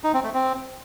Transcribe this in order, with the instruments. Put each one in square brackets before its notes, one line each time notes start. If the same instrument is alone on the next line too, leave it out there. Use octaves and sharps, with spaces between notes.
[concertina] D#4
C4
A3
C4